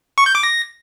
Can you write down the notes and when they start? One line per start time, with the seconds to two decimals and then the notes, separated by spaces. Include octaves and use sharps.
0.18 C#6
0.26 G6
0.35 D6
0.43 A#6